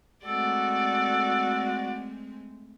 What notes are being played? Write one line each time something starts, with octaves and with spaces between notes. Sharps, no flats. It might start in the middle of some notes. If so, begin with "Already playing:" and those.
G#3 A3 C4 F#4 A4 D5